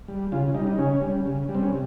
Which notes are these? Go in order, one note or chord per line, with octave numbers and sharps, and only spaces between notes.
G3
C#3 F4
G3 D#4
D#4
C#3 C#4
G3
C#3
G3
C4
C#4
C3